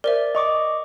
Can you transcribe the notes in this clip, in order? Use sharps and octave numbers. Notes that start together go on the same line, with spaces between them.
A#4 C5 D5 E5
D#5 C#6 D6